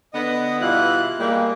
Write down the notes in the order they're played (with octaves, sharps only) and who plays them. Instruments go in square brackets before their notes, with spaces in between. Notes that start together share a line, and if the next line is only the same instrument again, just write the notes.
[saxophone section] D3 B3 [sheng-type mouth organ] D#5 D#6
[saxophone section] B2 E3 G3 [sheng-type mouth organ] E4 F4 F#6
[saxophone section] G3 G#3 [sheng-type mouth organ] A#3